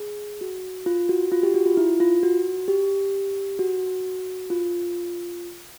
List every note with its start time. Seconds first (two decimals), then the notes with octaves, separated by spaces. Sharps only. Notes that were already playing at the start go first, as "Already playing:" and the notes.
Already playing: G#4
0.41 F#4
0.86 F4
1.09 F#4
1.32 F4
1.43 G4
1.54 F#4
1.66 F4
1.77 E4
2.00 F4
2.23 F#4
2.68 G4
3.59 F#4
4.50 F4